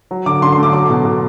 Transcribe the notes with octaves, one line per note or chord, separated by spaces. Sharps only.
F#3
D3 D6
D3 C6
C6
A3
D6
F#3 D6
B2
B2